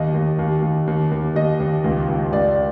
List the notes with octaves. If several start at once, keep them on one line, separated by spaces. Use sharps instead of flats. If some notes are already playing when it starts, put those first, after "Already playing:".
Already playing: D#2 D#5
D#2
D#2
D#2
D#2
D#2
D#2 D#5
D#2
C#2
C#2
C#2 D5